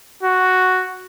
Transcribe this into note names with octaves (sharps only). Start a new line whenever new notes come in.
F#4